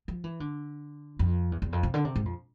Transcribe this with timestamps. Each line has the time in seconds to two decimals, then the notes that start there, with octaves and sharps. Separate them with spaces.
0.08 F3
0.24 E3
0.40 D3
1.19 F2
1.52 E2
1.62 E2
1.73 F2
1.83 C3
1.94 D3
2.05 C3
2.16 G#2
2.25 F2